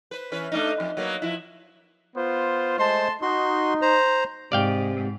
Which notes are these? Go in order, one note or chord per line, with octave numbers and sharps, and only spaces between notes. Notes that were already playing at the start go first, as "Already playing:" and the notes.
B4 C5
E3 C#4 B4
A3 D4 D#4
F2
F#3 A#3 B3
F3 E4
B3 F4 C5
G#3 A3 C5 A5 C6
D#4 F#4 C6
C5 A#5
G#2 C3 D5 F5 G5